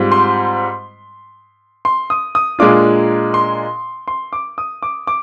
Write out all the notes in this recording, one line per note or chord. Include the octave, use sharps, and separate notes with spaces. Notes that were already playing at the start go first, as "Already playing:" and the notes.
Already playing: G#2 G3 C4 F4
C6
C6
D#6
D#6
A#2 G#3 D4 F4 D6
C6
C6
D6
D#6
D6
D6